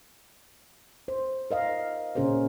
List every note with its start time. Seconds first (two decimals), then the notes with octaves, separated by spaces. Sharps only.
1.08 C5
1.51 A#4 D#5 F5
2.15 A#2 C#3 C#4 G#4 A#4 C5